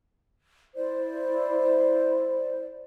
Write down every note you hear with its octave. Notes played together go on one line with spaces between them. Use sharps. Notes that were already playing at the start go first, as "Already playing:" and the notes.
E4 C5 D5